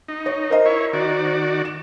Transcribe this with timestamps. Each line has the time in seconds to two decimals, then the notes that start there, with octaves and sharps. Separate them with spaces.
0.08 D#4
0.26 C#5
0.50 A#4 C5 D#5
0.65 E4 C#5
0.93 D#3 F#4 D5
1.65 E7